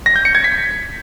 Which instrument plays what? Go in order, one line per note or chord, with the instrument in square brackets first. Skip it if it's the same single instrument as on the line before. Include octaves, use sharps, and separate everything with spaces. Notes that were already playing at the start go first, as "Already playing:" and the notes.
[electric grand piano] A#6
G6
C#7
G#6
B6